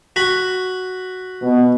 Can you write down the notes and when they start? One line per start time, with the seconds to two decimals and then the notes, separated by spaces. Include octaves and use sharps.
0.16 F#4 B5
1.42 B2